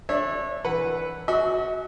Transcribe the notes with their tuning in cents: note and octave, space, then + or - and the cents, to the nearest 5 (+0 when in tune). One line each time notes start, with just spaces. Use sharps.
D4 +0 C#5 -30 E5 -5
E3 +0 B4 +0 F#5 +0
F#4 +0 E5 -45